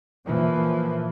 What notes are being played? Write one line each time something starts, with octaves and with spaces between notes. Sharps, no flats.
A#2 E3 F3